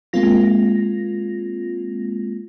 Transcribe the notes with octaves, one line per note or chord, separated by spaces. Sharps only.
G#3 A#3 C4 F4 A#6